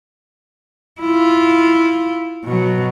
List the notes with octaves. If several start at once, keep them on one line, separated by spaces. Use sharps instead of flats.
E4 F4
B2 F#3